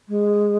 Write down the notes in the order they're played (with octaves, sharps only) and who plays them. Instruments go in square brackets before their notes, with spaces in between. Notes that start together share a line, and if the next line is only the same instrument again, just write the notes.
[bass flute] G#3